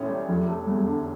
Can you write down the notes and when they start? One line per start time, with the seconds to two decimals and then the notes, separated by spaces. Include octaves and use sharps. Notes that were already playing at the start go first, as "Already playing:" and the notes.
Already playing: A1 A2 C#4
0.09 G3
0.28 F1 F3
0.47 A3
0.67 E2 G3
0.86 D3